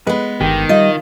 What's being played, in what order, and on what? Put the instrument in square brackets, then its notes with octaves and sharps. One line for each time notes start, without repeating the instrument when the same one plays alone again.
[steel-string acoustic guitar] G#3 B3 [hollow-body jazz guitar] B4
[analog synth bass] G1 [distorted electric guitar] D#3 [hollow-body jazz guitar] G4
[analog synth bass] G3 [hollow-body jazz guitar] F4 [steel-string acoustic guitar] D#5